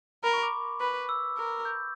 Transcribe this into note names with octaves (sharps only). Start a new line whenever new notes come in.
A#4 B5
C#6
D6
B4
E6
A#4
G6